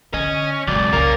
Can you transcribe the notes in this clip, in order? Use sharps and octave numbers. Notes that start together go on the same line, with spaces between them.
D3 C#4 D#5
C#2 F#2 B2 C4 D5
C#2 A#3 C#4 A#4